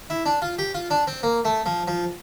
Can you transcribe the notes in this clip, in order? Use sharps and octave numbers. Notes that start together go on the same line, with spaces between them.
E4
D4
F4
G4
F4
D4
C4
A#3
A3
F3
F3